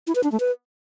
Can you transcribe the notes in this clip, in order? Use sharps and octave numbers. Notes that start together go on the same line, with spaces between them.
E4
B4
D4
A3
B4